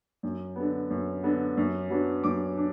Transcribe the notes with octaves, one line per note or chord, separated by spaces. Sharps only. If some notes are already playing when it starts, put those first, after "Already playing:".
F#2
D3 B3
F#2
D3 B3
F#2
F#3 B3 D4
F#2 D6
D4